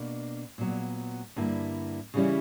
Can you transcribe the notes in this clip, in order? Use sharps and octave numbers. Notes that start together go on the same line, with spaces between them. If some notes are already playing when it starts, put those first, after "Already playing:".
Already playing: B2 A#3 D4
A#2 F#3 B3
G2 D3 A#3 E4
C#3 E3 G3 C#4 E4